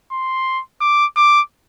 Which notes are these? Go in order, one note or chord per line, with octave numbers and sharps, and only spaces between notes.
C6
D6
D6